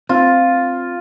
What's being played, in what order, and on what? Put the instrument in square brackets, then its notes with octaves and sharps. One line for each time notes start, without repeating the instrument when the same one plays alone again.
[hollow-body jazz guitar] C4 [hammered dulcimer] F4